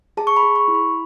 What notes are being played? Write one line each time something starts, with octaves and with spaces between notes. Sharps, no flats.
G#4 A5
C#6
B5
G#4
C#6
E4
B5